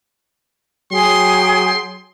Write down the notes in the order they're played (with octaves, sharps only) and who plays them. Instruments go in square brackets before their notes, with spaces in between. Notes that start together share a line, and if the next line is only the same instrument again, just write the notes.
[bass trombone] F#3 [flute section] G#4 G5 [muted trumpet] C6